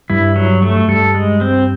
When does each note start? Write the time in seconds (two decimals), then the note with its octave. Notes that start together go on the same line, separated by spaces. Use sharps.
0.10 G2 G3 E4
0.36 F#3
0.62 A3
0.88 G2 G3 A4
1.15 G#3
1.41 C4